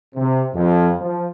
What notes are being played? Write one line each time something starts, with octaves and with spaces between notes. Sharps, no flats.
C3
F2
F3